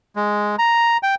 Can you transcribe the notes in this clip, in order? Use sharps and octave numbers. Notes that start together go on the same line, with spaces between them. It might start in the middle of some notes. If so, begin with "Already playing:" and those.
G#3
A#5
G5